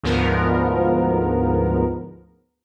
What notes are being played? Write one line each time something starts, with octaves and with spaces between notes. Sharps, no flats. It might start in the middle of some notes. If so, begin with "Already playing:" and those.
D2 G#2 F3 B3 A#4